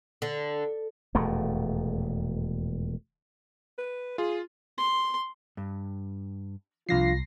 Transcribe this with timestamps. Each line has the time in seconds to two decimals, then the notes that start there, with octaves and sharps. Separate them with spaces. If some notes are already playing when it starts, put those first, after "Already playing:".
0.22 D3
1.15 E1 F2 A#2 A3
3.78 B4
4.18 F4 G#4
4.78 C6
5.57 G2
6.89 C2 F3 D4 F4 F5 A#6 C7